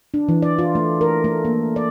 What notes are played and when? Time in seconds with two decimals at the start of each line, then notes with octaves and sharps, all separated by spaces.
0.14 D4
0.28 E3
0.42 D5
0.59 F4
0.75 A3
1.01 A#4
1.24 A3
1.45 A#3
1.76 D5